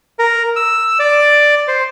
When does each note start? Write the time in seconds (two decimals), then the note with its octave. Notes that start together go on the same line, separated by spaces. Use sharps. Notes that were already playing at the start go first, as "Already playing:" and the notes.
0.19 A#4
0.56 E6
0.99 D5
1.68 C5